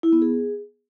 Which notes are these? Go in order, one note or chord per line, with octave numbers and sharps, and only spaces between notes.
E4
B3
G#4